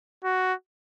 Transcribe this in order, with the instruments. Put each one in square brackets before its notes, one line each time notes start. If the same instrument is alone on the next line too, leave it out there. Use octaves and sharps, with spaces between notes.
[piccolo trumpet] F#4